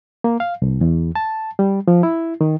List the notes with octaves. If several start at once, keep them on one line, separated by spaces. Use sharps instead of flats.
A#3
F5
C2
E2
A5
G3
F3
E4
D#3